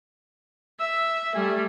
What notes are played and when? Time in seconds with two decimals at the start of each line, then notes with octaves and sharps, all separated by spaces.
0.80 E5 E6
1.35 G3 A3 G#5